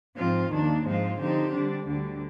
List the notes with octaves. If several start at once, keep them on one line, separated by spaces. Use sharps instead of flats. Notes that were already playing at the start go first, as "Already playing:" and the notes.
G#2 F3 C4 F4
D#2 D#3 A#3 D4
G#2 F3 G#3 C4 F4
D3 F3 C4 D#4 G4
D3 G3 D4
D2 D3 G3